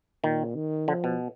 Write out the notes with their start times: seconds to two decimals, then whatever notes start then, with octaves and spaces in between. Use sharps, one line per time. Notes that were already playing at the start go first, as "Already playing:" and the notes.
0.23 A#2 D#3
0.56 D#3
0.88 D3 F3
1.04 B2